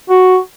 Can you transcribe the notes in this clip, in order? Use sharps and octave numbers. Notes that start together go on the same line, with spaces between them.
F#4